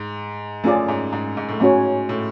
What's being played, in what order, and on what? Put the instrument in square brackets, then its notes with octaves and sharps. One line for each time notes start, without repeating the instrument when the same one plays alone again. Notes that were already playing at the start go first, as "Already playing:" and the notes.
Already playing: [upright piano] G#2
[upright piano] F#2 [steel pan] A3 C#4 F4 G#4 D5
[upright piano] G#2
G#2
G#2
A2
[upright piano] G#2 [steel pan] A3 C#4 F#4 C#5
[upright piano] A2